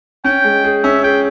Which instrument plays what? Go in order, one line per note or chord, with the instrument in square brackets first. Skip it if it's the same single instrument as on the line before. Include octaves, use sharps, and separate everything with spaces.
[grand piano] C#4 [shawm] G5
[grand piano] G#3
G#4
[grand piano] C#4 [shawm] E5
[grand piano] G#4 [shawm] G5